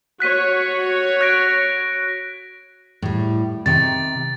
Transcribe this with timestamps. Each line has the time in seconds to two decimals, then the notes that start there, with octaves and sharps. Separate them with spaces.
0.20 F#4 C#5 F#6 B6 D#7
1.21 F#6 A#6 D7
3.02 A2 G3
3.66 C3 D#3 G5 A6